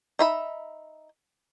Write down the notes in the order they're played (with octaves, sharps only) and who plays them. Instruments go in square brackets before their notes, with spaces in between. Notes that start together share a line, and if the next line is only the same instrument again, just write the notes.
[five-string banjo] D#4 E5 B5